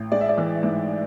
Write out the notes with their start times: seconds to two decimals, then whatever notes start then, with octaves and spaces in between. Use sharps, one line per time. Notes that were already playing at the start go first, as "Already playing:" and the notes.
Already playing: A1
0.12 G#3 D5
0.21 E5
0.29 D5
0.38 E3
0.63 G#2